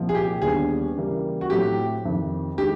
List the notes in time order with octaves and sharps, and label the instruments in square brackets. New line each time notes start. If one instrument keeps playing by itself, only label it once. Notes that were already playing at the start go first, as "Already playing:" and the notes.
Already playing: [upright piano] C2 A#2 F3
[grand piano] G#4
G4
[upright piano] D#2 D3 G3 B3 [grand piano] G#4
[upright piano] C#3 E3 G3 A#3
[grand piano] F#4
[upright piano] A2 F#3 A3 C4 E4 [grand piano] G4
[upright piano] F2 C3 D#3
[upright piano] D#3 G#3 [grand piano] G4